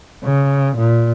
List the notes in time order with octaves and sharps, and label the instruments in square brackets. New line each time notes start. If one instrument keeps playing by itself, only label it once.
[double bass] C#3
A#2